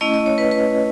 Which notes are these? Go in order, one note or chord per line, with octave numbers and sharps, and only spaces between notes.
A3 C#4 E4 D#5
D#5
C#5
B4
B4